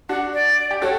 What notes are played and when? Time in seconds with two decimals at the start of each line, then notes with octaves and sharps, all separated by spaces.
0.09 D4 F#4 F#5
0.33 D5
0.71 G4
0.82 F#4 A4 C#5